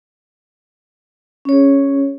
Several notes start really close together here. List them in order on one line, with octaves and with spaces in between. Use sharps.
C#4 C#5 G#4